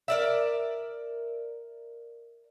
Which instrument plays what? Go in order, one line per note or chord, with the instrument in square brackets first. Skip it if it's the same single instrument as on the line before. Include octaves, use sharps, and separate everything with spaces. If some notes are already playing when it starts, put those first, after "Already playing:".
[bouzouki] A#4 D5 E5